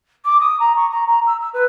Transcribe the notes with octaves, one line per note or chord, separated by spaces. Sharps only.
D6
D#6
A#5
C#6
A#5
A#5
E6
E6
B4